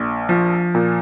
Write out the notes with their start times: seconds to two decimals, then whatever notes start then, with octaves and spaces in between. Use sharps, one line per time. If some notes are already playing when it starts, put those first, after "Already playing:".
Already playing: A#1
0.29 F3
0.75 A#2